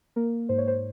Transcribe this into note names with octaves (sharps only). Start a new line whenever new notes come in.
A#3 A#4
G#2 C5
C#5
C5